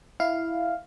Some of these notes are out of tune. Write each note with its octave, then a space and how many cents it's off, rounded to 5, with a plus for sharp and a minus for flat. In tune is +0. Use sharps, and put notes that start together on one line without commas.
E4 +0 F5 +0